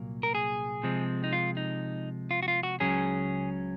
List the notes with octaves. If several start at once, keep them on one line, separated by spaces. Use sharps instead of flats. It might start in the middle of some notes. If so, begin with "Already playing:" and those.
Already playing: C2 A#2 F#3 A#3
A#4
G#4
C3 F3 G#3 C4
D#4
F4
D#4
F4
F#4
F4
F#4
C#2 C#3 F#3 C#4 G#4